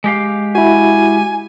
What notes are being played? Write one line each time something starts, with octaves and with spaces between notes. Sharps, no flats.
G#3 G4 F5
E4 F#4 G#5